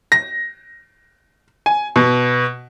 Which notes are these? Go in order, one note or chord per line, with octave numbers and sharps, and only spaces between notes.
A#6
G#5
B2